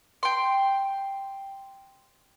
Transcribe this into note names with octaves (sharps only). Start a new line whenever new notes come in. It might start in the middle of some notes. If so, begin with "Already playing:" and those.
G5 C6